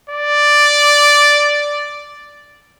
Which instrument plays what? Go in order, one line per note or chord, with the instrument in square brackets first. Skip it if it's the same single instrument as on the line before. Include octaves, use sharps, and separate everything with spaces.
[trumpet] D5